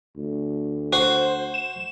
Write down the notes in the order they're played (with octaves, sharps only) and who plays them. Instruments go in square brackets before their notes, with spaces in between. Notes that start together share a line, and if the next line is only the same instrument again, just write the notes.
[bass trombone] D2
[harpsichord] F#4 [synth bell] C5
[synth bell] E7